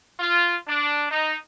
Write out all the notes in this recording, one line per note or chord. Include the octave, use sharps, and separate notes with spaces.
F4
D4
D#4